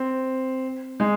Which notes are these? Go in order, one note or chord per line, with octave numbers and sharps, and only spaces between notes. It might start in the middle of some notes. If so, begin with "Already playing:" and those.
Already playing: C4
G#3